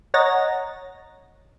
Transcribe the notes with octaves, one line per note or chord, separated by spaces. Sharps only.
C#5 D#5 F#5 A#5 A6 A#6